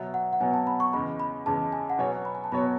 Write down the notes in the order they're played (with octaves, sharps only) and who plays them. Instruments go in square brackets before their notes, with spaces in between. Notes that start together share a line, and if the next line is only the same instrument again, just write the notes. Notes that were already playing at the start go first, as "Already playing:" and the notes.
Already playing: [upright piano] B2 F#3 B3 [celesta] E5
[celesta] F#5
F#5
[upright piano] B2 F#3 B3 [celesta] G#5
[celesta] A5
B5
C#6
[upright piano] E2 C#3 G#3 [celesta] B5
[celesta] B5
[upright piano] E2 C#3 G#3 [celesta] A5
[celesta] G#5
F#5
[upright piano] B2 F#3 B3 F#4 C#5 [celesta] G#5
[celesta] B5
G#5
A5
[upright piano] B2 F#3 B3 F#4 C#5 [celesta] B5